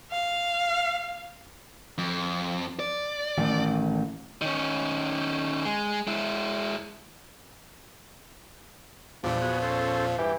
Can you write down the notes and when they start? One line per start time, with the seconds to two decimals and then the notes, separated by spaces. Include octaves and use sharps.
0.11 F5
1.98 F2
2.80 D5
3.37 A1 D#3
4.42 D#3 C#4
5.65 G#3
6.07 G#3 E4
9.24 E2 A#2 E3 F3 G3 D4
9.42 B3 F#4 G#4
9.62 C#4 A4 C5
10.18 G2 E3 G4